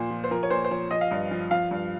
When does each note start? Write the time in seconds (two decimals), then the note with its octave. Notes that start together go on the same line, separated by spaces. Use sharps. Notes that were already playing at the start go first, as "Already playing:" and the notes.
Already playing: A#2 F3 C5
0.10 F3
0.24 C5
0.31 F3 A#4
0.43 C#5
0.51 A#2 C5
0.65 C5
0.71 F3 C#5
0.91 F3 D#5
1.01 F5
1.11 G2 D#5
1.31 F3
1.51 F3 F5
1.71 G2